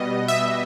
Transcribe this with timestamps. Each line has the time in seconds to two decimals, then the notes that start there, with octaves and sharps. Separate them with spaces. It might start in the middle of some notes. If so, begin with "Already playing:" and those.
Already playing: B2 G3 B3 D#5
0.28 E5